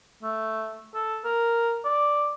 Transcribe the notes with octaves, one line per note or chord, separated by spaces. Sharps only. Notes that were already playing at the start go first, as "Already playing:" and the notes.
A3
A4
A#4
D5